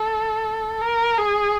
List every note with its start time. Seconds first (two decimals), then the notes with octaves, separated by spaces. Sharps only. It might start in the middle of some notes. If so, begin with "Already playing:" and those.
Already playing: A4
0.81 A#4
1.18 G#4